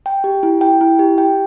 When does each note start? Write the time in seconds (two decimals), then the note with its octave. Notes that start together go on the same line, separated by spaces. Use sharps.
0.06 G5
0.24 G4
0.43 E4
0.61 G5
0.81 E4
0.99 G4
1.18 G5